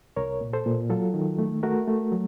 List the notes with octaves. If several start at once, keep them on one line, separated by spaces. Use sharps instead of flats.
C2 A#4 C#5
A#2
A4 C5
A#2
F#3 F4 A4
D#3
A3
A3 F#4 A#4
A3
F#3